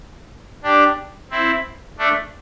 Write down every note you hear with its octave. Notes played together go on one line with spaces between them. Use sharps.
D4 G4
C4 E4
A3 D4